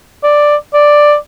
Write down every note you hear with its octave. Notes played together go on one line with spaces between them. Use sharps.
D5
D5